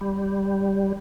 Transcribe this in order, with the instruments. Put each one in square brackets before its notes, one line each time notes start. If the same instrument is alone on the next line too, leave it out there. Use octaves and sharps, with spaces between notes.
[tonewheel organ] G3